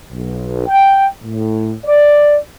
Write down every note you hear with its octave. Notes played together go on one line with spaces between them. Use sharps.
B1
G5
A2
D5